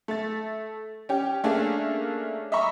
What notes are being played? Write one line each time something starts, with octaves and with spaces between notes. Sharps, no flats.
A3 A6
C#4 G4
A3 A#3 C#4 D4 G#4
D#5 E5 A#5 B5 C#6